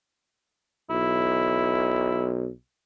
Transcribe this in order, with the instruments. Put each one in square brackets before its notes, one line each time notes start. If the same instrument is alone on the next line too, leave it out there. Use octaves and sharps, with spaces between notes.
[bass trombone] B1 [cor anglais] E4